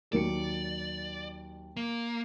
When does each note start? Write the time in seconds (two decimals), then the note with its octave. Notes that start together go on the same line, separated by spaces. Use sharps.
0.13 D#2 F#3 D5 C#7
1.77 A#3